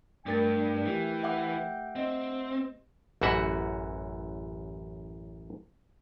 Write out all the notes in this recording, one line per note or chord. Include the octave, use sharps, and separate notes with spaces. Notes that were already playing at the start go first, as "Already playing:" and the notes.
G2 A3 A#4 G5 A6
E3 G4
E5 F#5 D6
C4 D#5
A1 F#2 E3 F#4 E5 F#5